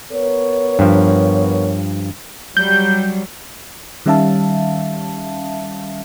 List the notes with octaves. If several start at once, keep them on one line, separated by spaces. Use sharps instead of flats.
B3 A#4 C#5
G2 F3
F#3 G3 G6
D#3 G3 C#4 E5 F5 A5